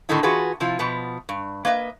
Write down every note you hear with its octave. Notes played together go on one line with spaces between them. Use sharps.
A2 D3 D#3 A3 D#4 E4
E3 F4 F#4 G#4 B4
C3 F3 E4 F4
B2 F3 B3
G2
A#3 B4 D#5 E5